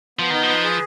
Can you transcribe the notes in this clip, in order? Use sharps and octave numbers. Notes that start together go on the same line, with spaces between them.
F3 B3
D#3 D#4
F3
B4
G#4